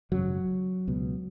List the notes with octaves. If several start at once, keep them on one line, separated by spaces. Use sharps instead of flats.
G#1 F#2 C#3 F#3
C#2 B2